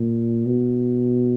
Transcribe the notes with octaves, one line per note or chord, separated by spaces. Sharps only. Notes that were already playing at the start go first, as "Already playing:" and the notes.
Already playing: A#2
B2